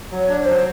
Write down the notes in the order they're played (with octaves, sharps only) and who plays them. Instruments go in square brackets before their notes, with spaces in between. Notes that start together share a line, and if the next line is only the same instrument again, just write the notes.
[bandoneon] F#3
[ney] C#5
[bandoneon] D4
[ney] C#5
[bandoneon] F#3 [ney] C5